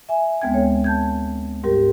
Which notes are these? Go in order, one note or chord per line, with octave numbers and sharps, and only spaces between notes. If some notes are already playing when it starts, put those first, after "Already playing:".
E5 G#5
D2 G#3 B3 C4 G5 G#6
A4 C#5
A5 G6 G#6
G#2 G3 G4 A#4